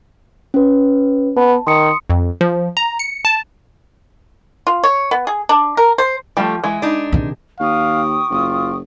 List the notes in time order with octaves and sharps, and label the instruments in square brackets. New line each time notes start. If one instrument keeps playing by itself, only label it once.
[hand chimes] C#4 B4
[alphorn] B3 [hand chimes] A5
[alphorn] D#3 [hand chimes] C6 D#6 C#7
[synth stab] F2
F3
A#5
C#7
A5
[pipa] F4
C#5
B3
G#4
D4
A#4
C5
[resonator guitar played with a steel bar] F3 [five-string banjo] G3 A3
[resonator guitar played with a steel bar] E3 [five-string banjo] G#3
[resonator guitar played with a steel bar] D4 D#4
[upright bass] C3 D#3
[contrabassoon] D#2 [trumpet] F5 [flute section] G5 C#6 D#6
[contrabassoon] F#1 [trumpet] F4